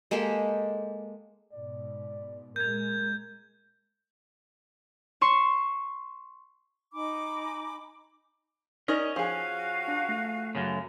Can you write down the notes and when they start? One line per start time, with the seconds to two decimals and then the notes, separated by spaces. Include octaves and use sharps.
0.11 G#3 A#3 G4 A4
1.53 G#2 B2 D5
2.56 A#2 G#3 A#4 G6 G#6
5.21 C6 C#6 E7
6.93 D#4 G#5 B5 D6
8.88 C#4 D#4 A#4 D5
9.16 F3 F#4 G#4 F5 G#5
9.88 D4
10.09 A3
10.55 F#2 C#3